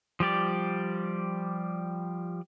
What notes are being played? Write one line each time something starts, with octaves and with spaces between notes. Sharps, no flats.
F3 G3 G4 D5